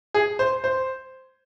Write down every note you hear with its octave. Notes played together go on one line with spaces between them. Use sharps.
G#4
C5
C5